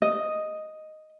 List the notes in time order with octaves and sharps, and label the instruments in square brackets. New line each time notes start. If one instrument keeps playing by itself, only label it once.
[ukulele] D#5